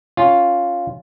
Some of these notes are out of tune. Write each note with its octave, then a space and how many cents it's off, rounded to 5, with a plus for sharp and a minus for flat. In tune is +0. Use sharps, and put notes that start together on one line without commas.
C#4 +0 F4 +0 C#5 +0